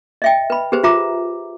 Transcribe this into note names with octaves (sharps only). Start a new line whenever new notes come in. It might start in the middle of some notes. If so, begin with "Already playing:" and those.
D#5 E5 G5
B4 B5
G4 G#4 B4 C5
F4 E5 A#5 D6